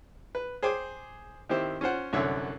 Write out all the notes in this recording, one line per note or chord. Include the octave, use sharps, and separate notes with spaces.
B4
G#4 C5 G5 G#5 D6
D#3 C4 E4 G4 C5
C#4 F4 C5 F#5
C2 F#2 D3 C#5 E5